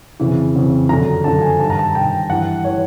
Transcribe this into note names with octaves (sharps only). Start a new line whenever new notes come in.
F2 C#3 E3
F2 C#3 E3
F#2 D3 F3 A#5
F#2 D3 F3 A5
G#5
G2 D#3 A5
A#5
A5
G2 D#3 G5
G2 E3 F#5
E3 C#5